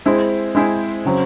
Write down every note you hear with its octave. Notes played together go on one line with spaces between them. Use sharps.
G#3 C4 E4 G#4 C5
G#3 C4 E4 G#4 C5
C#3 F#3 C4